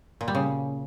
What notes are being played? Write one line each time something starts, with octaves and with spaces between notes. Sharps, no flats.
A#2
G3
C#3